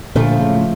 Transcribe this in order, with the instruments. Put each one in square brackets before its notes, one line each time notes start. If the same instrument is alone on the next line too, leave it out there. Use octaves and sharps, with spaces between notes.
[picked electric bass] A#2 D3 [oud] F3 A3
[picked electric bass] A2 C#3